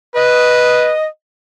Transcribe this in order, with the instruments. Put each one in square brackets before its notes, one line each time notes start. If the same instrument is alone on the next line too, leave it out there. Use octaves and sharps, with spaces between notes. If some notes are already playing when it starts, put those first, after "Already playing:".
[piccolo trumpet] B4 [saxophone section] D#5